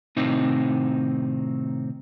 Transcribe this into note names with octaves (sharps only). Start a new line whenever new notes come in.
A2 C3 D#3 C4 D#4